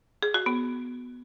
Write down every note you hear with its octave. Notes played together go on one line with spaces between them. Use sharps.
G#4
F#4
B3